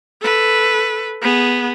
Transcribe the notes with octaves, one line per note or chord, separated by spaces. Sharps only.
A4 B4
B3 G#4